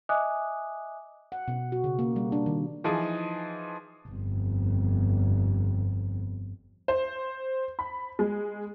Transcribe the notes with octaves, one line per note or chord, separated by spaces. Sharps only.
D#5 E5 G#5 D6 D#6 F#6
F#5
B2
F#4
C#3
A#3
G3
D4
D#3
E3 F3 D#4 G#4
G1 F2
C5
B5
G#3